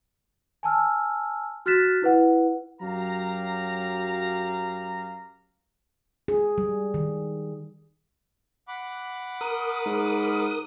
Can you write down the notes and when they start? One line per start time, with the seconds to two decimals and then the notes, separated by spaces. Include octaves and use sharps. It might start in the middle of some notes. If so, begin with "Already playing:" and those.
0.63 G#5 A5 E6 F6
1.66 F#4 F6 F#6 A6 B6 E7
2.02 E4 B4 F#5
2.82 F#2 F#3 G4 F5 A#5
6.28 G#4
6.58 G3
6.94 D#3
8.68 F#5 B5 D6
9.41 A#4 D#6
9.86 G#2